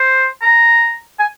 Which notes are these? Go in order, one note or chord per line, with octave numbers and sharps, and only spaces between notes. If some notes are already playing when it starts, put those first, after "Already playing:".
Already playing: C5
A#5
G#5